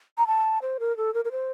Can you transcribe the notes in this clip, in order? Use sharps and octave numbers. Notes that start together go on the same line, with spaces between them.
A#5
A5
C5
A#4
A4
A#4
A#4
C5